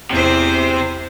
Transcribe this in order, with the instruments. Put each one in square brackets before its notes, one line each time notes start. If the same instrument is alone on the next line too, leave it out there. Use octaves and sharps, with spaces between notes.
[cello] E2 C5 [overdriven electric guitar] C3 C4